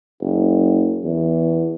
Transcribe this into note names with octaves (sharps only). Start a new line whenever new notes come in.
F#1
E2